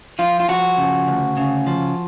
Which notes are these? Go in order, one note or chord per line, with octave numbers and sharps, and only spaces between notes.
F3 F4
F4
F3 F#4
C#3
D2
C#3
F3